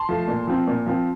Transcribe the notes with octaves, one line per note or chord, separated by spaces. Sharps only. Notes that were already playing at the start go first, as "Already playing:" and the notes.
Already playing: A5 C6
F3 A3
A#2
F3 C4
A#2
F3 C4